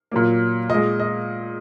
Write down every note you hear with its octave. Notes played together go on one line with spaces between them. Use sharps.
A#2 F#3 A#3
A#2 G#3 D#5
D#5